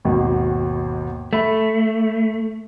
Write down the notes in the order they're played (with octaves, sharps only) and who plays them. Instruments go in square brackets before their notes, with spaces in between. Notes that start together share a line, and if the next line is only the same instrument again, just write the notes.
[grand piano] G#1 D#2 B2
[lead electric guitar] A3 [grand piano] E5 B5